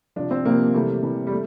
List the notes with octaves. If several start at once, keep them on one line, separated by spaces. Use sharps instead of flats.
C3 F3 D4
C4
C3 F3 A#3
C3 E3 G3 A3
C3 E3 G3
G3
A3